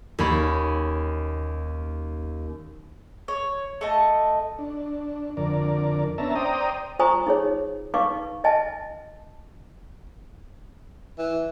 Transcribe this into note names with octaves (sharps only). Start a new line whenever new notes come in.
D#2 C#4 B5
C#5
A3 D#5 A5
D4
F2 D3 A#4 D5
B3 C#4 D4 E5 A5 A#5
C5 D5 G5 A#5 D#6
F4 C5 G#5 A#5 C#6 D#6
D#4 G#4 C#5
D#4 B4 F5 C#6 D6
D#5 E5 G#5 A5
E3